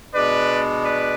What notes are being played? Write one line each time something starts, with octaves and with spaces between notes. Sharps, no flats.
B2 G#3 D4 B4 D5
B4 D5